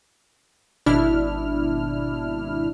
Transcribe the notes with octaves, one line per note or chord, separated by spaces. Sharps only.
G#1 B2 D4 E4 F6